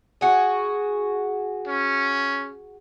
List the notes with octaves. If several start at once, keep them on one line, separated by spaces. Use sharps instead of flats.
F#4 G#4
C#4